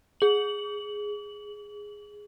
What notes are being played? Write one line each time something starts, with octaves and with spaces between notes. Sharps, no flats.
G#4 F#7